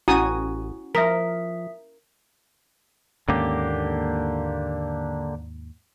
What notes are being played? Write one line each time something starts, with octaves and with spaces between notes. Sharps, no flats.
A1 C#4 E4 F#4 G#5 D#6
F3 A#4 E5 D#6 B6
D#2 G#2 D3 A#3 C#4 G4